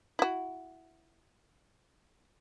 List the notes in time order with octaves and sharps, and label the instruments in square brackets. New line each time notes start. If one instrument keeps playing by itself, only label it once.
[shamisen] E4 F#4